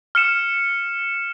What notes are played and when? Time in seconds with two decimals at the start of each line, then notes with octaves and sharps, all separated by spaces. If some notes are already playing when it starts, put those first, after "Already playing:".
0.15 F6 C#7 E7